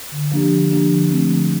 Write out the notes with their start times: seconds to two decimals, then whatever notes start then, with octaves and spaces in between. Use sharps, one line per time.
0.12 D3
0.32 F3 A#3 D4 G4
0.51 D3
0.71 F3 A#3 D4 G4
0.91 D3
1.11 F3 A3 C4
1.30 D3